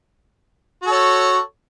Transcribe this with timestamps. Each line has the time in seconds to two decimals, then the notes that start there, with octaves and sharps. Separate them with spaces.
0.83 F#4
0.87 A4
0.91 C#5